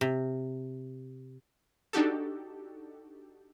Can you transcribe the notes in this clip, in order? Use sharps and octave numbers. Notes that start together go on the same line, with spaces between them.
C3
D4 D#4 F#4 G4 A4